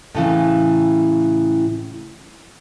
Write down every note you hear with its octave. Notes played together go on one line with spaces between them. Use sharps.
A2 C#3 E3